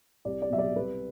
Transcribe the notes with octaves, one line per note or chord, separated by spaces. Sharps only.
C2 D5
D5
B2 F#3 E5
D5
C2 B4